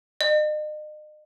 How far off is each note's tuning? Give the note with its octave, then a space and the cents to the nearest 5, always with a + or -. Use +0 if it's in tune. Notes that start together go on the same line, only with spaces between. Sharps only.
D#5 -40